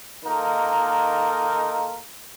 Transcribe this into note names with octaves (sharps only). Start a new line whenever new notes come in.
D#3 A#3 D#4 F4 A4 A#4